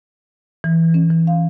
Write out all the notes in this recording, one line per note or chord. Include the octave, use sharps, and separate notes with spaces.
E3
C#4
E3
F5